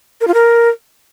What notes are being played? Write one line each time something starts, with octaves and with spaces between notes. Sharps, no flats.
A#4
F4
A#4